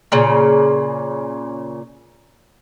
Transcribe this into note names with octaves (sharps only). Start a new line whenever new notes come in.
A#2 C#3